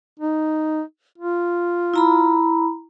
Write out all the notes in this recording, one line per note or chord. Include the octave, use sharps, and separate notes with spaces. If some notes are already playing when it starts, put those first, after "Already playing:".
D#4
F4
E4 A#5 B5